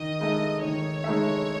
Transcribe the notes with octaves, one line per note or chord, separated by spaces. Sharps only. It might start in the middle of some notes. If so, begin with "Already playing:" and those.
Already playing: D#3 D#5
G#3 D#4 A4 E5
D#3 C#5
G#3 D#4 A4 E5